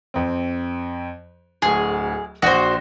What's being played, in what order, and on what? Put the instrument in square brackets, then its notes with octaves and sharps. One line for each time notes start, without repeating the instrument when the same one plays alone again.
[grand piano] F2 C4
[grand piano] D1 D2 [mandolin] G#4
[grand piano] A#1 D5 A#6 [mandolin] F#4 C5